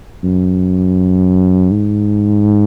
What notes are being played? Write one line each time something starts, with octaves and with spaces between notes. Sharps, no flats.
F#2
G#2